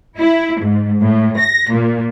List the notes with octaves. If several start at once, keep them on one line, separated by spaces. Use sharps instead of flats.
E4
G#2
A2
A#6
A#2